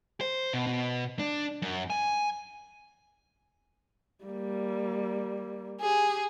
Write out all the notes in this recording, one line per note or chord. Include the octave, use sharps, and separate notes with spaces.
C5
B2
B2
D4
F#2
G#5
G3 A#3
G4 G#4